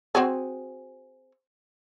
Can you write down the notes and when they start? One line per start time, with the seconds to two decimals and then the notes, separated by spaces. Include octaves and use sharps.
0.15 C4 F#4 G#4